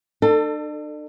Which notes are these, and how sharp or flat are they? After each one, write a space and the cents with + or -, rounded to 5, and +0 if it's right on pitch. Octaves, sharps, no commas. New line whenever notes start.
D4 +45 A4 +25